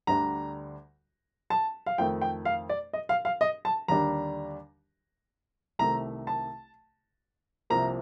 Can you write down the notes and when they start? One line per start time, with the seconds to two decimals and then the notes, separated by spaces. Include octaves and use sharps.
0.07 D2 D3 G3 D4 A#5
1.50 A5
1.86 F5
1.98 F2 D#3 A3 G5
2.22 G5
2.45 F5
2.69 D5
2.93 D#5
3.09 F5
3.25 F5
3.41 D#5
3.65 A5
3.88 D#2 D3 G3 D4 A#5
5.79 C2 C3 D#3 A3 A#5
6.27 A5
7.70 C2 C3 F3 A#3 A#5